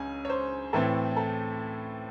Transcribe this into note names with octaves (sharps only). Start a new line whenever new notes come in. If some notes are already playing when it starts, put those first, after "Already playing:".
Already playing: C#2 C#3 C#4 G#5
C#5
C5
A2 E3 A3 C4 A4
A4